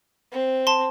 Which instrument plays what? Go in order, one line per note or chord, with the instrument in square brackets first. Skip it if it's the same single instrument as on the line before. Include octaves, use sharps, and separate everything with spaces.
[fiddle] C4
[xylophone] A5 C6